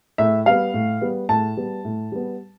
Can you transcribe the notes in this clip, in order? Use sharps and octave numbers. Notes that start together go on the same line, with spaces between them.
A2 E5
G3 B3 F5
A2
G3 B3
A2 A5
G3 B3
A2
G3 B3